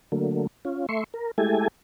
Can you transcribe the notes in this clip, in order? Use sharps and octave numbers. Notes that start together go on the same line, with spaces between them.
D3 F#3 A3 A#3
C#4 F4
A3 E5 C6 C#6
A#4
G#3 A3 E4 G4 A4 G#5